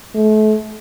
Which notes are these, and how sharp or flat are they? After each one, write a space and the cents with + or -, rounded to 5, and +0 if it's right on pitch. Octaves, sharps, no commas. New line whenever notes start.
A3 -35